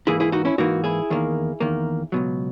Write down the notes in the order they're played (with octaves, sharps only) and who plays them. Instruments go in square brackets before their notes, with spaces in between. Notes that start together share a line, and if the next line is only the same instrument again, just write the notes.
[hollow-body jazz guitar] G#2 E3 A#3 E4 G#4
E4 G#4
D#4 F#4
C#4 E4
G#2 E3 A#3 D#4 F#4
E4 G#4
E2 D#3 A#3
E2 D#3 A#3
C#2 B2 F#3